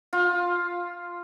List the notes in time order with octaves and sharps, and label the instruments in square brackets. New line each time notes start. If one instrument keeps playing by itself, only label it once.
[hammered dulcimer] F4